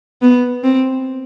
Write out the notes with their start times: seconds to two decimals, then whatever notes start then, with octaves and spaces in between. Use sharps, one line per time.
0.22 B3
0.63 C4